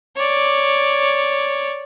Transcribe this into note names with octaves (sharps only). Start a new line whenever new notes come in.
C#5 D5